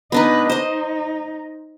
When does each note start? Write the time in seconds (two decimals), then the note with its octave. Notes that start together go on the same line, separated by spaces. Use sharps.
0.12 B3 D4 D#4 B4 D#5
0.50 D#4 C5 D#5